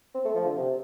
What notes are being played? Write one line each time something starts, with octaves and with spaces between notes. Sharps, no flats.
C4
A3
F3
D3
C3